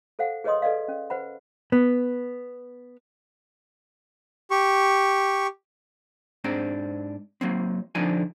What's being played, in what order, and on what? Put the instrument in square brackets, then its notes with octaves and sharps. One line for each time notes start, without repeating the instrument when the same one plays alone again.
[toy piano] A4 C5 F5 F#5
G#4 B4 C#5 D#5 C6 D#6
A4 B4 D5 D#5 F5
C#4
B4 C5 F#5 B5
[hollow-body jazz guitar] B3
[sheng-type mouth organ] G4 C#6
[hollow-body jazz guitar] G#2 C4 D4 A#5
F#3 A#3 C4
D3 F3 C4 D4 D#4 G#5